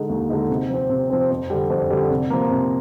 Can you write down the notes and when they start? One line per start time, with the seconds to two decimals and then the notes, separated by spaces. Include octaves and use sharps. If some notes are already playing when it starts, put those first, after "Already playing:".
Already playing: D3 G#3 D#4
0.09 D#2
0.30 D3 G#3 D#4
0.49 C3
0.70 F3 C4
0.90 C3
1.10 F3 C4
1.30 F2
1.50 D3 G3
1.70 F2
1.90 D3 G3
2.10 C3
2.30 F3 A#3
2.51 C3